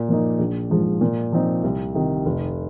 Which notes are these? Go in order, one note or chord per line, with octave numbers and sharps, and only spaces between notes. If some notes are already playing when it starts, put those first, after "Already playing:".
Already playing: A#2
F3 A#3 D#4
A#1
G#2 F3 G#3
A#2
F3 C4 D#4
C2
C3 D#3
F1